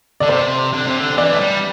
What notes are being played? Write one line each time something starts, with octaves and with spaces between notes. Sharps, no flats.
D3 D5
C3 C5
D3
C3
D3
E3 D5
A3
G3